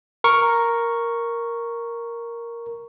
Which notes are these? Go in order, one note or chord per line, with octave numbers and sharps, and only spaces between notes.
A#4 C#6